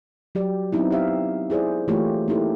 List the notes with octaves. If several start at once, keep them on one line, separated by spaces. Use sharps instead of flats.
F#3 G4 D5
F#3 B3 C4 D#4 E4
G4 E5 F5
E4 G#4 C5 D5
E3 A3 A#3 F4 G4 C#5
A#3 C#4 D#4 E4 G4 A4